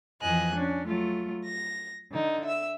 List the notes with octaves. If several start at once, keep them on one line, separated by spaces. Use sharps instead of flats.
F2 E3 D#5 G#5 F#6
C#4 D4
F#3 A3 F4
A#6
D3 D#4
E5 E6